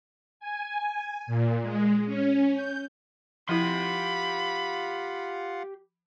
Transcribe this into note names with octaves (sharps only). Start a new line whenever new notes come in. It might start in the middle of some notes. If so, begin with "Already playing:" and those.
G#5
A#2
G#3
C#4
G6
F3 E4 F4 G4 F5 F#5 B5 C6